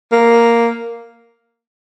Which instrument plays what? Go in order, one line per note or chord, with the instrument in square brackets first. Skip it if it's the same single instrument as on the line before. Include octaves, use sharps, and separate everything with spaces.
[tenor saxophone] A#3